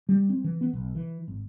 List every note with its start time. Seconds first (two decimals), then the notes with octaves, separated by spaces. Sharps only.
0.09 G3
0.29 C4
0.44 E3
0.61 B3
0.73 B1
0.95 E3
1.28 G#1